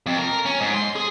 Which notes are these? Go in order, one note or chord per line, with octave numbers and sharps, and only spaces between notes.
F2
A#4
C#4
G#2
C6
G#4